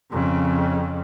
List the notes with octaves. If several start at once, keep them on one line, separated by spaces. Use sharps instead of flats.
F2 C#3